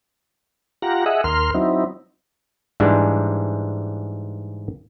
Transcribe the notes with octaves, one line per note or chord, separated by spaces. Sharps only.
F4 G4 F#5 A#5
G#4 D#5 E5 F#5
D#2 A#4 C6 F6
F#3 C4 D#4 E4
G#2 E3 G3 G#3 D4